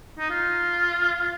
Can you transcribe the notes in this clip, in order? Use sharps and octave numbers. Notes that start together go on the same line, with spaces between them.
D#4
F4